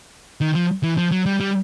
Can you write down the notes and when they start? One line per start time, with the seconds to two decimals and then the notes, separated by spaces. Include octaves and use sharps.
0.41 D#3
0.55 F3
0.83 E3
0.97 F3
1.11 F#3
1.26 G3
1.40 G3